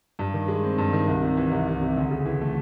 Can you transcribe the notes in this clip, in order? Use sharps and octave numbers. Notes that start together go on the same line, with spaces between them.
G2
D#3
G#3
C4
G2
D#3
C2
C3
E3
C2
C2
C3
D2
C#3
E3
A3